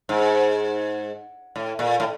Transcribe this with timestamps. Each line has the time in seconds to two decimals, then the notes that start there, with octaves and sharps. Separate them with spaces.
0.09 G#2
1.56 A2
1.79 A#2
2.00 A2